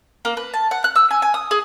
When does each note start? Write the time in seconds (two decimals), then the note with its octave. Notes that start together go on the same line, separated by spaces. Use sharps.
0.25 A#3
0.37 B4
0.54 A5
0.71 F#5
0.84 F#6
0.96 E6
1.11 G#5
1.22 G#5
1.34 D#6
1.51 G#4